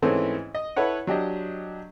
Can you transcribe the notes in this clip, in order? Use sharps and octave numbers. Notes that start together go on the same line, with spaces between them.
G#2 E3 A3 C4 C#4 E4
D#5
E4 A4 B4 C#5 F#5
F#3 D4 G4 D#5